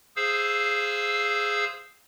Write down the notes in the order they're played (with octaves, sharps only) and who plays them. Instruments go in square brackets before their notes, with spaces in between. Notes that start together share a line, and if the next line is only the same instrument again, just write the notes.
[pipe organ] G#4 C5 F5 E6